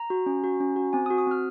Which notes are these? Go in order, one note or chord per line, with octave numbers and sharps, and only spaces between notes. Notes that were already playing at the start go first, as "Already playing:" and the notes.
Already playing: A#5
F#4
C#4
F#4
C#4
F#4
C4 G#5
D#6
F#4
D#6
C4 F6